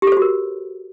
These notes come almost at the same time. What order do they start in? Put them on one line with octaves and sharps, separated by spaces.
G4 A4 C5 F#4 A#4